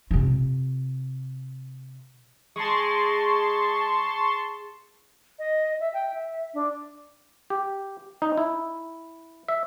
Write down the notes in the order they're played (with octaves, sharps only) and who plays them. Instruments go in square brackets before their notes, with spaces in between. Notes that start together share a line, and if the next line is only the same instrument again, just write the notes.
[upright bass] C3 F4
[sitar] G#3 [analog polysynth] A5 C6 C#6
[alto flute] D#5
E5
G5
E5
D4
[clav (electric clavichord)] G4
D#4
E4
E5